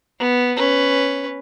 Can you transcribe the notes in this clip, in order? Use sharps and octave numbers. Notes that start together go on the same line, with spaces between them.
B3
C#4 B4